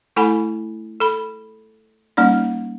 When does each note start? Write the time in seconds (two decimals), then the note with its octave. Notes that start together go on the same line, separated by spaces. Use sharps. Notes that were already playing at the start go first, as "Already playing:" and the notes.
0.16 A3 E4 A4 F#5 G#5 B5
1.00 A4 B5
2.17 G3 A#3 C#4 D#4 D5